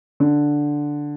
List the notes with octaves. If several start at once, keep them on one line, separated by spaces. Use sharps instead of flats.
D3